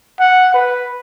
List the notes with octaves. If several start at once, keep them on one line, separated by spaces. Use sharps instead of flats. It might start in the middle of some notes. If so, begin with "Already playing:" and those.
F#5
B4